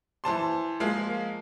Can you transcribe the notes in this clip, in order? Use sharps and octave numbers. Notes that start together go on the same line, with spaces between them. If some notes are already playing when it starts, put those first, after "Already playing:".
E3 C5 A5 C6
F3 G#3 A#3 F5